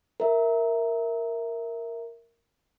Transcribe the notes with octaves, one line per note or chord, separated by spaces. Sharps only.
A#4 E5